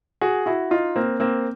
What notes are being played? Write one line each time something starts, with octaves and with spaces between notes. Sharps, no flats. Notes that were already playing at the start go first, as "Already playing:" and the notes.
F#4 G#4
E4 F#4
D#4 F4
A#3 C4
A#3 C4